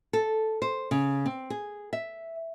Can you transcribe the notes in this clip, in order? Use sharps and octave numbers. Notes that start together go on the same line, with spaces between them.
A4
C5
C#3
C4
G#4
E5